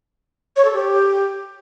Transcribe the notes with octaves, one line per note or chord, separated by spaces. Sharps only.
C#5
A4
G4